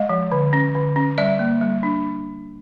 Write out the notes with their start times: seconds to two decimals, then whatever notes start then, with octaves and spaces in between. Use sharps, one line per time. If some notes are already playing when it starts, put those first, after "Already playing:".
Already playing: G#3 D#5 F5
0.09 F3
0.32 D3
0.53 C#4
0.75 D3
0.96 C#4
1.18 G3 D5 E5
1.39 A#3
1.61 G3
1.83 D4